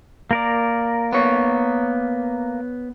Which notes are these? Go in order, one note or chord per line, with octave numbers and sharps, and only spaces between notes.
A#3 A#4 D5
B3 C#5